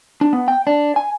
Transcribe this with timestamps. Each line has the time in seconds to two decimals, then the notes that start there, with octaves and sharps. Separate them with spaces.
0.21 D4
0.33 B3
0.48 G5
0.67 D4
0.96 G#5